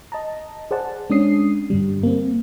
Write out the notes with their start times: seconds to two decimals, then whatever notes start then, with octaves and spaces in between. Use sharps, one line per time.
0.12 D#5 A5 A#5
0.71 G#4 C5 D5 F#5 A5
1.10 G#3 C#4 D4 D#6 C7
1.70 G2 D3 G3
2.03 A#3 C4